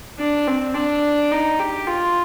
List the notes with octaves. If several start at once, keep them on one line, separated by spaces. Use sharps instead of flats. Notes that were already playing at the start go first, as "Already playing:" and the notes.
D4
C4
D4
D#4
G4
F4